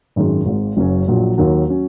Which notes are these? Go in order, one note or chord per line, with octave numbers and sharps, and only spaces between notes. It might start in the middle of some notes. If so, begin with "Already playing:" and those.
G#1 F#2 D#3 G#3
G#1 G#2 G#3
F#1 F#2 F#3 C#4
A#1 A#2 F#3
D#2 D#3 F#3 A#3
F#3 C#4